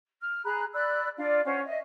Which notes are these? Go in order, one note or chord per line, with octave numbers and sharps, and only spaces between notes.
F6
G#4 A#5 B5 F#6
D5 B5 E6 F#6
D4 F4 D5 F5
C#4 F4 C5 F#5
D#5 E5